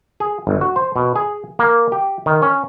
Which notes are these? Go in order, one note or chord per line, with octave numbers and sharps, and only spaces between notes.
G#4
G1
F#4
C5
B2
G#4
A#3
G4
D#3
C#4